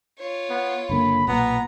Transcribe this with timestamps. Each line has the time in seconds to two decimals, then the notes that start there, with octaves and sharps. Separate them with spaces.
0.19 F4 C#5
0.50 B3
0.90 F#1 D3 A#3 B5
1.28 B1 A#2 B3 A#5